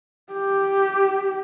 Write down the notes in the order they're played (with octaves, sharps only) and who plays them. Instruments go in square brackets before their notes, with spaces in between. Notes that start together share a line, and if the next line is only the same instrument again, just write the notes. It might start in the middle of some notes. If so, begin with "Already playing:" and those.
[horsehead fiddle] G4